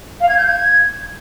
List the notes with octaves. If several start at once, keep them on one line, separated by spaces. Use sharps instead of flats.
F5
G#6
G6
G#6